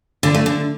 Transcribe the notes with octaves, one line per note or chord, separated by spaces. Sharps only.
D3
A3
D3